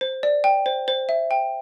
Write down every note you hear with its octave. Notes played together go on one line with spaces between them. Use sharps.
C5
D5
G5
C5
C5
E5
G5